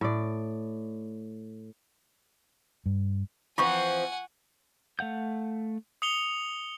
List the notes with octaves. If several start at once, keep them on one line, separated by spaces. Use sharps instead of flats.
A2 D5
G2
E3 F3 C4 F4 F#5 G#5 C#6
A3 F5 F#5 G6
D#6 C#7 F7 G7